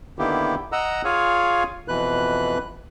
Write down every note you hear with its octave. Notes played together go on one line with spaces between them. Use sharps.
D3 D#3 A#3 B3 E4 G4
D#5 F#5 A#5 E6
F4 G#4 C#5 F5 G#5
F2 B2 E3 B4 F#6